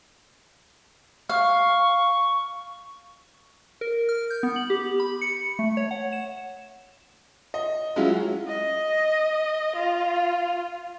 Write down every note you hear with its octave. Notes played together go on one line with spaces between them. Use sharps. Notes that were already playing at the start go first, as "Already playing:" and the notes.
F5 C#6
A#4
F6
G6
B3
F#7
G4
B5
C#7
A3
C#5
F#5
E7
D#5
F#3 G#3 C#4 E4 F4
D#5
F4